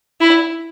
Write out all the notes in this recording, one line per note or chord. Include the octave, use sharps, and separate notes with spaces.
E4